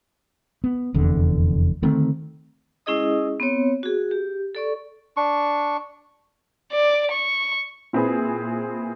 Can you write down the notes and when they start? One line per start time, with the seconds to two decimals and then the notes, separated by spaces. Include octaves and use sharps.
0.64 B3
0.94 F1 E2 D3
1.82 D3 D#3 A3 C4
2.86 G#3 C#4 E4 G#4 D#5 D#6
3.40 B3 C4 C#5
3.83 F#4 G#4
4.11 G4
4.55 A4 D5 C#6
5.17 D4 C#6
6.73 D5
7.11 C#6
7.93 A#2 C4 E4 G#4 B4